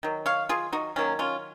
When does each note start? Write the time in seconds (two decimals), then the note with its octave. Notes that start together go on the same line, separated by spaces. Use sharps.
0.03 D#3 F#3
0.26 C#5 F5
0.49 F4 G#4
0.73 D#4 F#4
0.96 D#3 F#3 A#3 C#4
1.19 C#4 F4